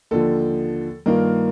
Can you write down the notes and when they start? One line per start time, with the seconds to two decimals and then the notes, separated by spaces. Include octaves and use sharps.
0.11 D#2 D3 F3 A4
1.06 G2 D#3 A#3 F4 A#4